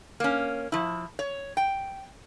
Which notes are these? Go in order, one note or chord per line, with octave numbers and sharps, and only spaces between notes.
A#3 C#4
F3 E4
C#5
G5